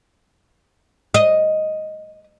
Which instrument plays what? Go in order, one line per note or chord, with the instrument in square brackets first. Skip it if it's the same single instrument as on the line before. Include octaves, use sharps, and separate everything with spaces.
[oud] D#5